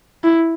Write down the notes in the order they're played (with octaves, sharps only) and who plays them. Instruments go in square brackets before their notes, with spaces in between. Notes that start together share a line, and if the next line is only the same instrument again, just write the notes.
[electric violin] E4